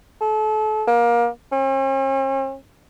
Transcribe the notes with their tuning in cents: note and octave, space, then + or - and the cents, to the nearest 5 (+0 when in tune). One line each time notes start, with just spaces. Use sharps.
A4 -35
A#3 +25
C#4 -45